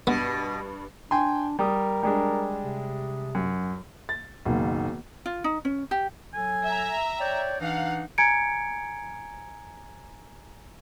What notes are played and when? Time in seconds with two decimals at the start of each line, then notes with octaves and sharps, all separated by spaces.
0.07 G2 B2 B3
1.11 D4 G5 G#5 C6
1.59 G3 A#4 D#6
2.03 G3 G#3 D4
2.63 C3
3.35 F#2
4.09 A6
4.45 F#1 B1 D#3 F5
5.26 F4
5.44 D#4
5.65 C#4
5.91 G4
6.34 F#3 A4 G#5
6.65 E5 A#5
7.19 C#5 D5 G5
7.60 E3 D4 D#4 F5 F#5
8.18 G#5 A#5 G#6 C#7 D7